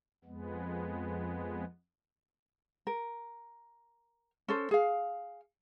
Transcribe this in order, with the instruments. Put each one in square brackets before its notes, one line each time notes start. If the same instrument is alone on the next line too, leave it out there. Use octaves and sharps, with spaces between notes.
[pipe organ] F2 G#3 B3
[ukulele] A#4
C#4 A4 C5
G#4 F5